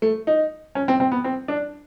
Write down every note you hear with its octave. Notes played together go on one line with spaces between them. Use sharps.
A3
D#4
C#4
C4
C4
B3
C4
D4